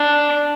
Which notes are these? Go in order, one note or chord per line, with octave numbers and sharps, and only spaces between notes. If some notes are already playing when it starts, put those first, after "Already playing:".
Already playing: D4